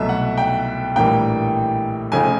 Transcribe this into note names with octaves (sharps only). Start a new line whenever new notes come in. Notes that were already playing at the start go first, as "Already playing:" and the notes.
Already playing: C2 B2 F#3 A3 E5
F#5
G5
A#1 A2 E3 G3 A#3 G5
F1 F2 C#3 F3 A3 G#5